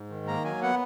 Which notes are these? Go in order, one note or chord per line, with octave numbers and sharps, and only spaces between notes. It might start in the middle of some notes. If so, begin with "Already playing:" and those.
Already playing: G#2
D#3
A#3 A#5
F#3 G#5
B3 F#5